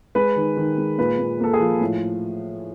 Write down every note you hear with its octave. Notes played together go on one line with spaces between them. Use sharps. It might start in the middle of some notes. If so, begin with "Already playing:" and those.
G#3 B4
D#3
D#3
G#3
A#2 B4
A#2
A#3 A4
G#4
F3
A2